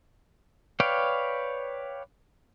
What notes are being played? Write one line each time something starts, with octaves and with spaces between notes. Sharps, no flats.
B4 C#5 D5 F5 G5